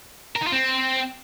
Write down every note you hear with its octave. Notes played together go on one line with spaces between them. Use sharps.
A#4
D#4
F4
C4